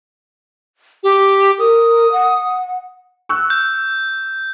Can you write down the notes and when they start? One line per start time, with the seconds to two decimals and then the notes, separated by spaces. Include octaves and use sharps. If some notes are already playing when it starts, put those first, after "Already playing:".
1.03 G4
1.59 A#4 D#6
2.12 F#5
3.29 C#6 E6 F#6
3.50 G6